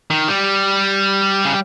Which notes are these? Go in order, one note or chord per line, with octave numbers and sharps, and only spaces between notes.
D#3
G3
C#3